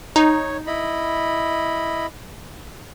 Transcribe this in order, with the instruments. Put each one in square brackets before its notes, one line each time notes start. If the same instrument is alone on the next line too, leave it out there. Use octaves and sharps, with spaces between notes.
[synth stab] D#4 [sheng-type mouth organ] C#5
[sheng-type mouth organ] E4 D#5 B5